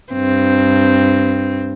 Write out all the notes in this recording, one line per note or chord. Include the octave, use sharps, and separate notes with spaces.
G2 C4